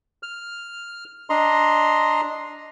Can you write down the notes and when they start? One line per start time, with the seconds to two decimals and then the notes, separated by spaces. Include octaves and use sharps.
0.23 F6
1.30 D4 D#5 A#5 C6